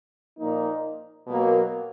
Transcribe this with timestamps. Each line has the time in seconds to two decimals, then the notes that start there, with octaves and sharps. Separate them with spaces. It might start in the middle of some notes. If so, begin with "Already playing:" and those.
0.37 A#2 F3 A#3 D#4
1.27 B2 F#3 A#3